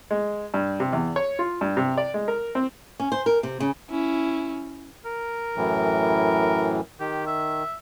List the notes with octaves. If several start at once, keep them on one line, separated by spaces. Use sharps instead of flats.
G#3
G2
C3
E2
C#5
F4
G2
C3
D5
G#3
A#4
C4
C#4
C5
A#4
C3
C#3
C#4 E4
A#4
F#2 A2 E3
D#3 G4
E5